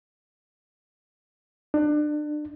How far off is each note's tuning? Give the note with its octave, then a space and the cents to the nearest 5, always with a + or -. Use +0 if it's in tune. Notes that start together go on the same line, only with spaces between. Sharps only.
D4 +30